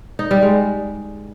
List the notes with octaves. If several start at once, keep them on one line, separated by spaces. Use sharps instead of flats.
D#4
G3
G#3